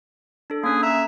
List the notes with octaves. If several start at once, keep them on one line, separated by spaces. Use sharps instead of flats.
D4 A4
A#3 C#4 G#4
E5 A#5